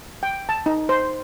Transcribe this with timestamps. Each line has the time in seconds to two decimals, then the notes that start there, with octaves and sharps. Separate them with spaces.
0.23 G5
0.49 A5
0.66 D#4
0.89 C5